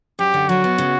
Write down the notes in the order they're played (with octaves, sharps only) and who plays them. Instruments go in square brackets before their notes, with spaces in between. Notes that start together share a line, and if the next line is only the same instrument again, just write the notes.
[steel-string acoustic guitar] F#2 [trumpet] G4
[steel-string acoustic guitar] D3
[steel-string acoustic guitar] F#3 [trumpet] F#4
[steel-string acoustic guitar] B3
C#3